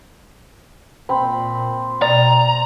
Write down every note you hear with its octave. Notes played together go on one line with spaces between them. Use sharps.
A#2 C4 B5
B2 D5 A#5